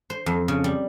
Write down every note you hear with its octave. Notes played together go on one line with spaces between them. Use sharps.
C5
F2
C#3
G3